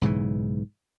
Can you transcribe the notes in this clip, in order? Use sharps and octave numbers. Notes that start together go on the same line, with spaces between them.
B1 G#2 C#3 E3